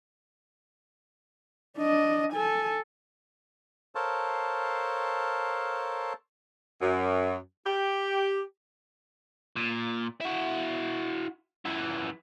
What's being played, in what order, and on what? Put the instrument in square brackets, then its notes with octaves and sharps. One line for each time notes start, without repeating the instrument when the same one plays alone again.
[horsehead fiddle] D4 D#5
A4 G#5
[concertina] A4 A#4 C5 C#5 F5 A5
[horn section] F#2
G4
[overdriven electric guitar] A#2
E4 F#4
F#2 E3